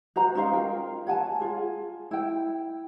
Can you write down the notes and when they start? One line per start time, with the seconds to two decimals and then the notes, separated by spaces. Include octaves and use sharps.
0.16 F#4 C5 A#5
0.35 C#4 D#4 C5 F5
0.53 F4 A#4 G5
1.07 C#5 F#5 G#5 A5
1.40 F4 G#4
2.11 E4 G5